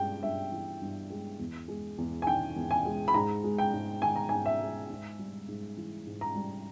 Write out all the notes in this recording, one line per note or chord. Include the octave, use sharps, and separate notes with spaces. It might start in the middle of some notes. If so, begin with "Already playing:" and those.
Already playing: G2 G#3 G5
G2 E5
E3
G2
G#3
E2
G#3
E2
G#5
D#3 G5
E2
G#5
G#3
B5
G#2 A#5
G#3
G5
G#2
D#3 G#5
A#5
G#2 G#5
E5
G#3
G#2
G3
G#2
E3
G#2
A#5
G3